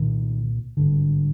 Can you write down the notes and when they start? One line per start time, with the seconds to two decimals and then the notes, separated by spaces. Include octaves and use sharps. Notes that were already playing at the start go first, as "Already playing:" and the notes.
Already playing: C2 A#2 D#3
0.77 G#1 G2 D3